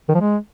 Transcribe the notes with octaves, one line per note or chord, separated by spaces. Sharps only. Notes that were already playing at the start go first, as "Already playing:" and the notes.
D#3
F3
G#3